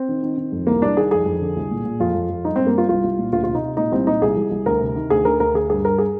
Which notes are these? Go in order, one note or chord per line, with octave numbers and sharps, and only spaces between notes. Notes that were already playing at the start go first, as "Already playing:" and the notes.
Already playing: C4
D#3
D#3
D#3
F2
C2 A#3
C2 D4
D#3 G#4
F2 G#4
F2
D3
C2
A#2
A#2
F2 F4
F2
F2
G2 D#4
G2 C4
A#3
G2 F4
C2 F4
C2
A#2
D2 F4
C3 F4
D#4
C3
A#2 D#4
C2 C4
A#2 D#4
C2 G#4
C2
C2
D2 A#4
C3
D#3
D2 G#4
D3 A#4
D2 A#4
D3 G#4
G2 G#4
G2 A#4
G#4